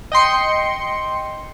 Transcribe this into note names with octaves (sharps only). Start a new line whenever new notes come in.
D#5 G5 C6 C#7